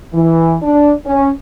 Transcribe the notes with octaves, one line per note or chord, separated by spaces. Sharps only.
E3
D4
C#4